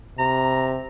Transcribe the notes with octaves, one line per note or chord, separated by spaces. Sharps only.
C3 A#5